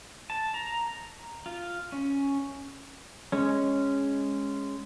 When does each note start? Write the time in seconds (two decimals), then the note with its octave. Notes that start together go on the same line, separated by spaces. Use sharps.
0.30 A5
0.54 A#5
1.46 F4
1.92 C#4
3.32 G#3 C#4